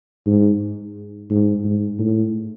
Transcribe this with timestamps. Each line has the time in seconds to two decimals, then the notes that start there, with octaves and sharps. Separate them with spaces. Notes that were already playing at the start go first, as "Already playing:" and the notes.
0.26 G#2
1.30 G#2
1.64 G#2
1.99 A2